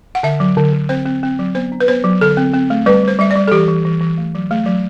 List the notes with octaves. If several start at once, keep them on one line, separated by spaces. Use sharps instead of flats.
F#5
D3 E5
F#3
D3
D3
C4 C5
C4
C4
F#3
B3 C5
D4
B4
B3 C5
F#3
D3 A4
C4
C4
A3
G3 B4
G3 C5
G3 E5
D5
G3
A4
E3 G4
E3
E3
E3
A3
F#3
A3
F#3